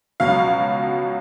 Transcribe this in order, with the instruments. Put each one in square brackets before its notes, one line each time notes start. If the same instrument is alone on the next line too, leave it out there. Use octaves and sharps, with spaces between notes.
[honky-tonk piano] C#2 B2 F#3 F5